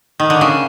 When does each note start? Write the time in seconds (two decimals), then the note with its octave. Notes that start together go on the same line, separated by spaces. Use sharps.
0.20 D#3
0.30 D3
0.41 C#3